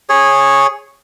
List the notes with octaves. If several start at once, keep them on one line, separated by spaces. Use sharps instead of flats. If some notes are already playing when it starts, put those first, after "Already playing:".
G#4 C#5